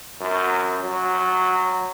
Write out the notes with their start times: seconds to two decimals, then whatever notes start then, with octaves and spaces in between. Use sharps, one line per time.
0.21 F#2
0.84 F#3